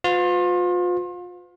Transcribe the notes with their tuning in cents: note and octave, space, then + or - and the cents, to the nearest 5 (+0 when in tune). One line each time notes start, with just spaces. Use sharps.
F4 +35 B4 +45